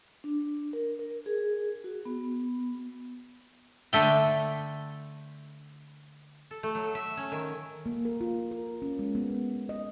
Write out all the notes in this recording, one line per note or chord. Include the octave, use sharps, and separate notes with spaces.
D4
A#4
A#4
G#4
F#4
B3
D3 A3 G5
A4
A3
F#3
E5
C#4
D#3
A#3
A#4
F4
A#4
C#4
G#3
B3
D#5